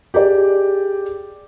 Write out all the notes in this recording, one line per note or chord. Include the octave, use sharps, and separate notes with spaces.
G4 G#4 D5